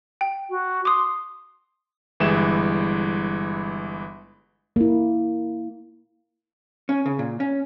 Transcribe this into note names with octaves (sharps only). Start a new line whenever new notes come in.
G5
F#4
C6 D6 D#6
G1 E3 G3 G#3 E4 E7
A#3 E4
C#4
C#3
A#2
C#4